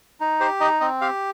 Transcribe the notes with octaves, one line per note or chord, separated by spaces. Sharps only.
D#4
G4 C5
D#4 D#5
C4 D#5
G4 F5